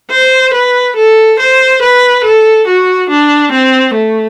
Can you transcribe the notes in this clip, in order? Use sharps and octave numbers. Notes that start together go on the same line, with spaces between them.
C5
B4
A4
C5
B4
A4
F#4
D4
C4
A3